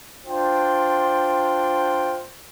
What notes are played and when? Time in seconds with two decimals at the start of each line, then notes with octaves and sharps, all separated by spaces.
0.24 D4 F4 C5 G5